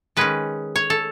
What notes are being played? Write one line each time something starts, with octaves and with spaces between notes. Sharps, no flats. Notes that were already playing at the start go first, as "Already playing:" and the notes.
D#3 G#3 C#4 B4
C#5
A4